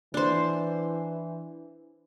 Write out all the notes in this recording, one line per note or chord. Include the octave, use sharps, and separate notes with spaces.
E3 D4 C5